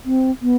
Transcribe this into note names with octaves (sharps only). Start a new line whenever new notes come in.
C4
B3